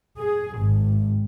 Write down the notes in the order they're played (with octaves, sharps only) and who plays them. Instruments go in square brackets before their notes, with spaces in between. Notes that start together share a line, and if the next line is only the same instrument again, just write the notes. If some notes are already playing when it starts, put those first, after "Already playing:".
[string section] G#4
G#1